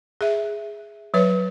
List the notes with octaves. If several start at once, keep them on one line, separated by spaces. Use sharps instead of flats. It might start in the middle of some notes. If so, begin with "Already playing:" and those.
G#4 E5
F#3 B4 C#5